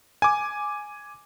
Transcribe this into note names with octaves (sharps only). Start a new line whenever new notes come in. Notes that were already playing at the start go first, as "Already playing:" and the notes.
G#5 D6